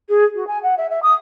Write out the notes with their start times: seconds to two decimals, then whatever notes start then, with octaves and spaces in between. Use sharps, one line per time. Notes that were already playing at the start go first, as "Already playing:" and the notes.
0.09 G#4
0.35 F#4
0.47 G#5
0.63 F#5
0.78 E5
0.90 E5
1.03 D#6